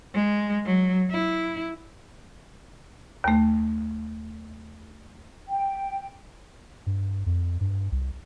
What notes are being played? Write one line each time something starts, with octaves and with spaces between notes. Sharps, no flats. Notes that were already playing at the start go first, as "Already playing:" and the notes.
G#3
F#3
E4
D#2 A3
G5
G2
F2
G2
C2